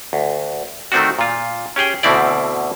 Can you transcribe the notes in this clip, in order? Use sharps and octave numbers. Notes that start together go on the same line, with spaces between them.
D2
D#3 A3 C4 D4 F#4
A#2 F4
C#4 G4 G#4 G5
D2 B2 D3 C4 E4 D5